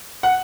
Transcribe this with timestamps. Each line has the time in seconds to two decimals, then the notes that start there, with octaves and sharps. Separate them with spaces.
0.23 F#5